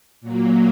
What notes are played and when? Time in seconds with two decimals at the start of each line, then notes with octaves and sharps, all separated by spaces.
0.21 A#2 F#3 A#3